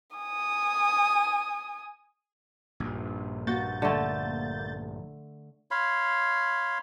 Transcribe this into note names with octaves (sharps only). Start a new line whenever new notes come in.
G#5 D#6
A#1 G2
A#3 F#4 G6 A6
D3 A3
C#5 F5 B5 C6